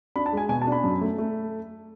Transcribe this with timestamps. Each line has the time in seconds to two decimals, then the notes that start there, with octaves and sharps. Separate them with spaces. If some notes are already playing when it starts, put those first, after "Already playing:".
0.16 D4 B5
0.26 A5
0.33 G#3 G#5
0.49 B2 G#5
0.61 A5
0.67 D4 B5
0.84 F#2
1.01 A3
1.18 A3